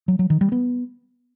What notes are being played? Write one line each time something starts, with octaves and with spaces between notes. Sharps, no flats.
F#3
F#3
D#3
G3
B3